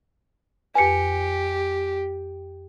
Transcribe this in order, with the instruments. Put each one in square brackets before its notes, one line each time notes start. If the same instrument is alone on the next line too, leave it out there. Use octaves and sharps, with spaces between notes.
[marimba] F2 B4 [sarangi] G4 [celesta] G#5 C#7